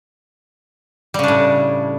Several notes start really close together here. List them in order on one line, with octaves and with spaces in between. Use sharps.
G3 C#3 D4 A2